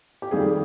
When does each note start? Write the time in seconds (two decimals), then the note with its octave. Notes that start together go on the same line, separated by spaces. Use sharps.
0.22 G4
0.31 F2 D#3 G3 G#4